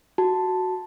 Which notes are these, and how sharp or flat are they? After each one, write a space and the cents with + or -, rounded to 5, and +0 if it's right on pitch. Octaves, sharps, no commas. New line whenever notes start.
F#4 +0 A5 +0